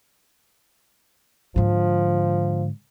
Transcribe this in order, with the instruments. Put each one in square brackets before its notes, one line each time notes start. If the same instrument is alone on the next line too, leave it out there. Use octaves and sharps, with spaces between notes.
[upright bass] G#2 D3 [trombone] F3